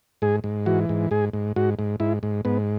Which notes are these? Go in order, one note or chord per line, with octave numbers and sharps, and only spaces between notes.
G#2 G#4
G#2
E3 F#4
G#2
G#2 G#4
G#2
G#2 F#4
G#2
G#2 E4
G#2
G#2 B3